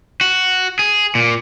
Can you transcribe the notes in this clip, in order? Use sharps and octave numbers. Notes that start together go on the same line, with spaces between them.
F#4
G#4
A#2